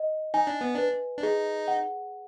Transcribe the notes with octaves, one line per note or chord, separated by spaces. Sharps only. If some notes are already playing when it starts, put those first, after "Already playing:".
Already playing: D#5
D#4 G#5
D4
B3
D4 B4
D4
D#4 G#4
F#5